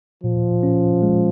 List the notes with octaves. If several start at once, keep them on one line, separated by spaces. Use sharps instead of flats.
A#2 F3
C#4
G#3